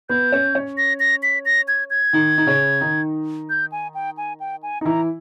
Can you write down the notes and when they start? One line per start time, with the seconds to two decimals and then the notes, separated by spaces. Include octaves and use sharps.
0.09 B3 B4 G6
0.32 C#4 C#5
0.55 C#4 C#5
0.78 A#6
1.00 A#6
1.23 B6
1.46 A#6
1.68 G#6
1.90 G#6
2.13 D#3 D#4
2.38 D#4
2.47 C#3 C#4
2.81 D#3 D#4
3.50 G6
3.72 G#5
3.95 G5
4.17 G#5
4.40 G5
4.63 G#5
4.81 D#4
4.85 E3 E4 A#5